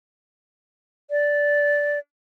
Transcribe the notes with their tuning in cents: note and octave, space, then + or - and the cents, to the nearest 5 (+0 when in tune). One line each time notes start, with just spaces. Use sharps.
D5 -10